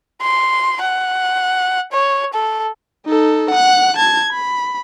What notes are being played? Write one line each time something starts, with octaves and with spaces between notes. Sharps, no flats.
C6
F#5
C#5
A4
D#4 A4
F#5 F#6
A5 G#6
B5